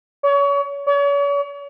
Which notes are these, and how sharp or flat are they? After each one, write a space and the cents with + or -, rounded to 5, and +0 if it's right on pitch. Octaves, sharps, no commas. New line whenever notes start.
C#5 +30
C#5 +40